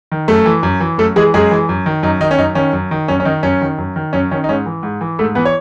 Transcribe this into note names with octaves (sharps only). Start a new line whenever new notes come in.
D#3
F#2 A3 A4
E3
F#2
E3
F#2 A3 A4
E3 G#3 G#4
F#2 G#3 G#4
E3
F#2
D#3
F#2 D#4
D#3 D#4
C#4
F#2 D#4
D#3 C#4
F#2
D#3
F#2 C#4
C#4
D#3 D#4
F#2 C#4
D#3
F#2
D#3
F#2 C#4
D#3 C#4
D#4
G#2 C#4
E3
G#2
E3
G#2 A3 A4
E3 B3 B4
C#5